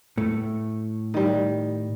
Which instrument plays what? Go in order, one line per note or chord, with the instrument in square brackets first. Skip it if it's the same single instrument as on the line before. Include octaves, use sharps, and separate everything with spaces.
[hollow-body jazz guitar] A2 A3
[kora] D#3 G3